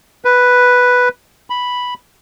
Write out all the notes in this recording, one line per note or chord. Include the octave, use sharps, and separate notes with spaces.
B4
B5